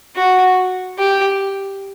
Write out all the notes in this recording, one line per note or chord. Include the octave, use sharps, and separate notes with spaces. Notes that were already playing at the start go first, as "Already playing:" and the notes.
F#4
G4